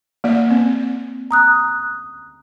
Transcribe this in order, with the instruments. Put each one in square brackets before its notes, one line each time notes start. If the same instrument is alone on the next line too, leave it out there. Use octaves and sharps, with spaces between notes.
[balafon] A#3 D5
C4
[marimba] A#5 D#6 F#6